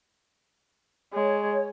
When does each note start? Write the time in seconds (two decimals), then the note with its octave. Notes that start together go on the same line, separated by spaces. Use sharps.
1.14 G#3 C#5